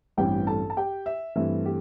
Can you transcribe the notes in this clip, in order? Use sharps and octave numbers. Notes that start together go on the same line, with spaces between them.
A1 G2 E3 G3 C4 G4 G5
A4 A5
A5
G4 G5
E5
G2 E3 A3 C4 E5
G4